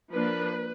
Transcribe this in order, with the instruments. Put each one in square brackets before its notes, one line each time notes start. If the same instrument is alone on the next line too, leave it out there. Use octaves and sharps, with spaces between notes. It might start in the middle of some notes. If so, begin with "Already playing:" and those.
[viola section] F3 A#3 D4 B4